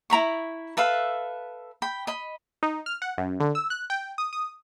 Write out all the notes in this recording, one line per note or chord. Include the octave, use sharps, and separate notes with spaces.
E4 A#5 B5 C#6
A4 B4 E5 F5
G5 B5
D#5 B5
D#4
F6
F#5
F#2
D3
E6
F#6
G5
D#6
D#6